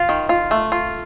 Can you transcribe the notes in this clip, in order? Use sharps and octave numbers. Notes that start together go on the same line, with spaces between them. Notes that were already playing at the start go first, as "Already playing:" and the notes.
Already playing: F4
D#3
F4
A3
F4